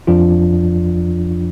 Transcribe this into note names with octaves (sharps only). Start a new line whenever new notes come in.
F2 F3 D4 F4